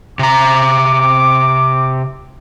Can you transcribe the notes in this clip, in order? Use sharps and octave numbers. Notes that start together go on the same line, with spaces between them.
C3 A#5 D6